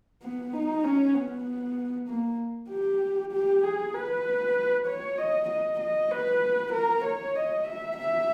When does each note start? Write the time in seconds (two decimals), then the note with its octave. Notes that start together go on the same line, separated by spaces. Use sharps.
0.22 B3
0.53 D#4
0.84 C#4
1.14 B3
2.08 A#3
2.69 G4
3.32 G4
3.63 G#4
3.94 B4
4.86 C#5
5.18 D#5
5.49 D#5
5.80 D#5
6.11 B4
6.72 A#4
7.04 C#5
7.35 D#5
7.65 E5
7.96 E5